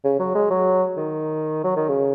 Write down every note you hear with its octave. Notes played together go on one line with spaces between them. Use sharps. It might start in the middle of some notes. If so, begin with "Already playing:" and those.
C#3
F#3
G#3
F#3
D#3
F#3
D#3
C#3